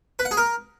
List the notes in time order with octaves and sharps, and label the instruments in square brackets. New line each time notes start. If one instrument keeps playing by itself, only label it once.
[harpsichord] B4
F#5
G#4
A#4